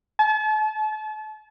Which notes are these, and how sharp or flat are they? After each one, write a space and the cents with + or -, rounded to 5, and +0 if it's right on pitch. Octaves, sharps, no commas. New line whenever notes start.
A5 -40